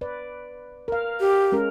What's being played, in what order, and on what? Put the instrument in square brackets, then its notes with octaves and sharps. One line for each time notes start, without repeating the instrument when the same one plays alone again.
[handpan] B4 D5
A#4 F5
[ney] G4
[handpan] G#3 C#4 A#4